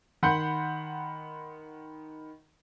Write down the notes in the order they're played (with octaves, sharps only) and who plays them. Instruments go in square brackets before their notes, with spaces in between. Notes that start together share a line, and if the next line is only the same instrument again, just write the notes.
[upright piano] D#3 F#5 B5 C6 G6 C#7